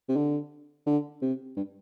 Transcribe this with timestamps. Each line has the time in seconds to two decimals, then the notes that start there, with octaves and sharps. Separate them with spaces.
0.09 C3
0.16 D3
0.86 D3
1.22 C3
1.56 G2